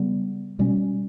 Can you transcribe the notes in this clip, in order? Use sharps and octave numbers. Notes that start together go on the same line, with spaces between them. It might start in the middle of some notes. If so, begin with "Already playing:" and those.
Already playing: C#3 G3 B3
B2 G3 C#4